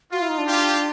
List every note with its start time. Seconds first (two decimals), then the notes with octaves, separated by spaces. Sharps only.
0.12 F4 F#4
0.21 E4
0.29 D#4
0.38 D4
0.47 F4 G4